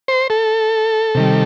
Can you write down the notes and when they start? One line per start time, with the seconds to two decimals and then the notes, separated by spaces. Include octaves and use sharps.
0.08 C5
0.30 A4
1.15 C3 D#3 G3